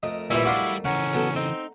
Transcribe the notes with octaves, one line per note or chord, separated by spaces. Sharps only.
F2 A3 A#4 D#5
A#1 E3 G3 E4
D4 F4 F#4
C#3 E3 C#4 F#5 A#5
F#3 B3 A4
C4 D#4